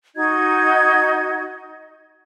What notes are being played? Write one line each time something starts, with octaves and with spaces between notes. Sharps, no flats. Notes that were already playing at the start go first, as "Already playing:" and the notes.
D#4 F#4 D#5 G#6